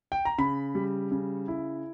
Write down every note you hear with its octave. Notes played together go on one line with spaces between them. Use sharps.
G5
A#5
C#3 B5
G3
C#3
E4